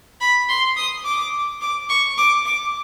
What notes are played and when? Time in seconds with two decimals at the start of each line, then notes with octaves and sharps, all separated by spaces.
0.21 B5
0.49 C6
0.77 D#6
1.05 D6
1.61 D6
1.89 C#6
2.18 D6
2.46 D6